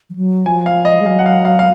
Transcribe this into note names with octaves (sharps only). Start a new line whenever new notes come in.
F3
F#3
F3 G#5
F5
D#5
G#3
F#3 F5
F#5
F5
F5
F5